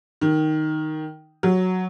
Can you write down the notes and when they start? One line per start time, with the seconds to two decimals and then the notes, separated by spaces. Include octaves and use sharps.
0.21 D#3
1.43 F#3